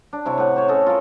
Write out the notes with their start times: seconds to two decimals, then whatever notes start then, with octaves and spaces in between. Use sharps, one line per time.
0.13 D4
0.26 C3 E4 C#5
0.38 A2 F#5
0.56 C5 C#5
0.68 C#4 A4 D#5
0.87 F4 A4 A#4